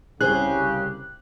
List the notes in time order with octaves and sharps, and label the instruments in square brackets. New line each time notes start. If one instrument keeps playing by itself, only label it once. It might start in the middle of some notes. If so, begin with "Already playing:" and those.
[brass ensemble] C2 C#3 G4 [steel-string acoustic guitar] G#4 C5 [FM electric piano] F#6